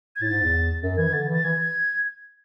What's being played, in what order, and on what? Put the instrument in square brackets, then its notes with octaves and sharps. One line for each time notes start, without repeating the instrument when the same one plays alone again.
[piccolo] G#6
[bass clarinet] A2 [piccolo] A6
[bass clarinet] G#2
E2
F#2
[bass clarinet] E3 [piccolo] G#6
[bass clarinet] E3
[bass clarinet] D3 [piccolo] A6
[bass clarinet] E3
[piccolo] A6
[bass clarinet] E3 [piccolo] G#6